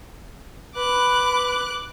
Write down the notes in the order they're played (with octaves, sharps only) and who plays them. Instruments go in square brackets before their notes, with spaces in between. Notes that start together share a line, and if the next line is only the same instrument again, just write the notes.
[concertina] B4 [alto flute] B5 [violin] D6 F#6